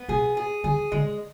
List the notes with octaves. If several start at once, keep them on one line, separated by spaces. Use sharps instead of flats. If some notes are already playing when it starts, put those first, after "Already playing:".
Already playing: B3
B2 G#4
G#4
D3 G#4
D3 G#3